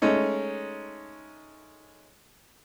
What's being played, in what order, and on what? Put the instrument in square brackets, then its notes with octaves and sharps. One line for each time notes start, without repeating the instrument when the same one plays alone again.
[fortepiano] G#3 A3 C#4 D#4